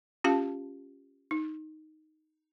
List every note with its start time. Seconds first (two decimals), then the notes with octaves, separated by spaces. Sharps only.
0.24 C#4 F4 G4 F5 A5
1.31 D#4